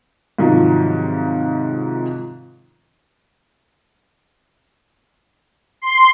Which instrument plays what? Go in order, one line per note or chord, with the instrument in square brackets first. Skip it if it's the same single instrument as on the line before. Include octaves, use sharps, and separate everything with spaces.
[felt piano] G#2 C3 D#3 F3 F#3
[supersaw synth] C6